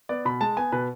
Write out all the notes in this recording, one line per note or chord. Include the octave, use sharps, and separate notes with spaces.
B3 D5
B2 B5
G#3 A5
B3 G#5
B2 B4